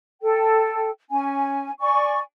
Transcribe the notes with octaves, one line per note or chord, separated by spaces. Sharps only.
A4 G5
C#4 G#5
D5 G#5 C#6